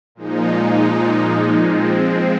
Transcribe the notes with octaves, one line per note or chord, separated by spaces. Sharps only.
A#2 F3 G#3 D#4
F3 G#3 C4